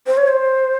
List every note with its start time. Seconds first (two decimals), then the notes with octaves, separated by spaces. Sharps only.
0.07 C5
0.17 C#5
0.28 C5